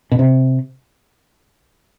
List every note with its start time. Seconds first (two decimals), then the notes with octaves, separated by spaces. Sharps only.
0.11 B2
0.19 C3